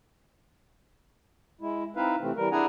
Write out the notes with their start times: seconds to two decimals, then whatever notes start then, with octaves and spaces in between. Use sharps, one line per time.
1.61 G#3 E4
1.96 C4 D#4 E4 B4 E5 F5
2.21 C3 E3 A3 C4
2.36 E3 G3 A#4
2.52 D4 E4 G#4 F#5 G#5 A#5